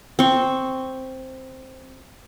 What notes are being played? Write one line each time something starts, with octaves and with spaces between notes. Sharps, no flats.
C4 C#6